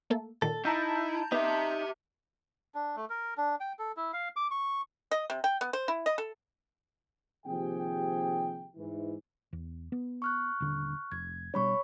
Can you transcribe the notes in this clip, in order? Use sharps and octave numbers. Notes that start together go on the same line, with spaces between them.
A3 A#3 A4
A#2 D#3 A4
D#4 E4 A5 A#5 G6
B3 D#4 G4 E5
D4
A3
A#4
D4
G5
A4
E4
F5
D6
C#6
D#5
C3
G5
B3
C5
E4
D#5
A4
D#2 C3 F3 G4 G#4 G5
G#2 E3
E2
B3
C#6 F6 F#6
D#1 D3
F1 G#6
B2 G3 D4 C#5 B5 C#6